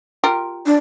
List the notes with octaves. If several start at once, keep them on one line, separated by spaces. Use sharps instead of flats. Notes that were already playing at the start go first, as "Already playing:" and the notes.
F4 G4 A#4
D4